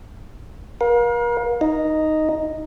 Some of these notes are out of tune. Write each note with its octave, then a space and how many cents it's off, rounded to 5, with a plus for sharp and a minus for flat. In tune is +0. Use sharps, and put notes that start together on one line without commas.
A#4 +40 F5 +30
D#4 +0 D#5 +0